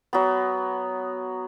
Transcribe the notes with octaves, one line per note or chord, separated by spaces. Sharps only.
F#3 B3